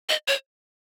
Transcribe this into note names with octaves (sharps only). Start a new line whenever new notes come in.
D#5
C#5